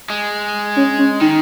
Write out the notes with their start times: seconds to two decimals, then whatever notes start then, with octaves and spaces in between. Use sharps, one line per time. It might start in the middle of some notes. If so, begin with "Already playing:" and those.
0.10 G#3
0.76 C#4
0.98 C#4
1.21 D#3 D#4